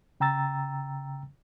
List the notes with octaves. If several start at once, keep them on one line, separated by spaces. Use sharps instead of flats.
C#3 G5 A#5 E6 A6